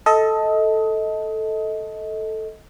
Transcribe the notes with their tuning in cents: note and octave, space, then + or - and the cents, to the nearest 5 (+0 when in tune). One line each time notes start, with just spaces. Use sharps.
A4 +0 D#5 +25